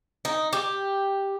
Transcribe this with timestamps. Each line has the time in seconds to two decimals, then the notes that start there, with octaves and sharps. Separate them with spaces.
0.25 D#4
0.53 G4